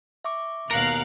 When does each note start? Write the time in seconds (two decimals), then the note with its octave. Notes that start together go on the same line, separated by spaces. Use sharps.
0.24 E5 C#6 D6
0.71 D#2 B2 A#4 F5 F#6 A#6 C#7 D7